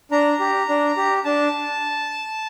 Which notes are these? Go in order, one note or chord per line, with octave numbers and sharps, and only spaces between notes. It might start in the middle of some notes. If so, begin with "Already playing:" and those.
D4 A#5
G4
D4
G4
D4 A5